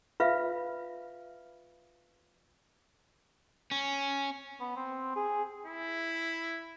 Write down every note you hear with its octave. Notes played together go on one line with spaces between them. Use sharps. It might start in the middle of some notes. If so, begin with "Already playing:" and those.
F4 B4 E5 F5
C#4
B3
C4
G#4
E4